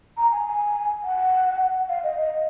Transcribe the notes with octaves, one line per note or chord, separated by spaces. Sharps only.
A#5
G#5
G#5
F#5
F5
D#5
D#5